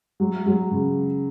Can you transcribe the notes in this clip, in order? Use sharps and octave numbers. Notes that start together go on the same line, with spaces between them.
F#3
F#3
C#3